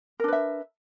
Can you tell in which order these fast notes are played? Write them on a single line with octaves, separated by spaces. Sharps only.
A#4 D4 B4 E5